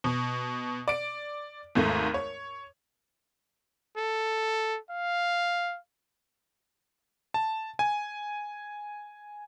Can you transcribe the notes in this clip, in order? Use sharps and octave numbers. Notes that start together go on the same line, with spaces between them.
B2
D5 D7
G#1 D#2 G#2 A3
C#5
A4
F5
A5
G#5